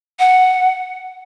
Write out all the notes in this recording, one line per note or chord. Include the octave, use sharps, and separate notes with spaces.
F#5